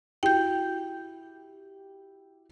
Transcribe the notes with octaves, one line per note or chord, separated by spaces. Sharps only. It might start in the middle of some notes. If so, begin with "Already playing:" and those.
E4 F#4 G4 G5 G6